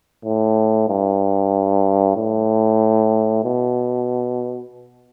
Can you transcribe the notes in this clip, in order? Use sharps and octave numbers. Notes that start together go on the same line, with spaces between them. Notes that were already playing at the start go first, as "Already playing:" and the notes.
A2
G2
A2
B2